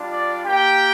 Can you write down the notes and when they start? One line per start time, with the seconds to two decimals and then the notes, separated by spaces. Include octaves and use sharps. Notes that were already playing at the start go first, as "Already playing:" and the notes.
Already playing: G3 D4 F4
0.12 D5
0.45 A#3 G4 G5